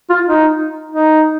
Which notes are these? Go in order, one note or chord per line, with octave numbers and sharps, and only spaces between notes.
F4
D#4
D#4